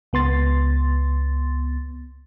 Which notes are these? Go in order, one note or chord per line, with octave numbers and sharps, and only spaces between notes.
C#2 B3 C6 A6